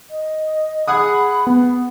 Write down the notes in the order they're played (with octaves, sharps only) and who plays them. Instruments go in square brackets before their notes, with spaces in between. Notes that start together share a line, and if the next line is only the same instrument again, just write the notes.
[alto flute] D#5
[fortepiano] G#4 F#5 D#6 [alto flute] B5
[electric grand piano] B3